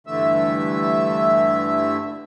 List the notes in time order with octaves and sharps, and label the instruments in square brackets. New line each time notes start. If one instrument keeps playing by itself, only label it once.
[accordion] G2 D3 E3 A3 E5 E6